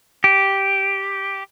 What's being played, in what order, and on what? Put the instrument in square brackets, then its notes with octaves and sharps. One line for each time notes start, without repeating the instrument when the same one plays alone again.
[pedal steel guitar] G4